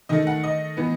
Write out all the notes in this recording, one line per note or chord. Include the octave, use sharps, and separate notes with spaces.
D#3 A3 D#5
F#5
D#5
A2 E3 B3